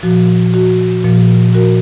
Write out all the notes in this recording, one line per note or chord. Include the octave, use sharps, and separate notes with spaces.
A#2 F3 F#4
F#4
A#2 F3
F#4 A#4